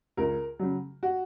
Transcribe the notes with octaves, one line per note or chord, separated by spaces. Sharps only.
C#2 A#4
C#3 F#3
F#4